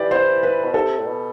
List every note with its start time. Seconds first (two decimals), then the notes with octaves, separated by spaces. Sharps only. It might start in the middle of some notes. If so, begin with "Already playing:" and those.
Already playing: E3 G4 D5
0.11 C5
0.43 B4
0.64 B2
0.74 C3 A4
0.98 A2
1.06 B2